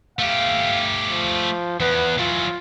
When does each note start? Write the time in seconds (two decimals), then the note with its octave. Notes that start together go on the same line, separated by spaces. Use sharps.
0.19 A3 G4 F5
1.09 F3
1.80 E2 B3
2.18 E3 F#3 F4